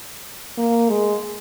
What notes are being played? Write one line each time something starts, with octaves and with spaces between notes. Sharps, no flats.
A#3
G#3